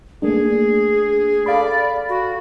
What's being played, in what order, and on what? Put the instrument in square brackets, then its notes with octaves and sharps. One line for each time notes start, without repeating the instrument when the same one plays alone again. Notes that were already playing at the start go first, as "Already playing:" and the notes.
[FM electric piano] A3 A#3 D4 [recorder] G#4
[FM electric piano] A4 F5 B5 [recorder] D5
[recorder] F#4